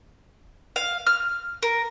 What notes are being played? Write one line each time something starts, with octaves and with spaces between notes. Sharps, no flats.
F5
F6
A#4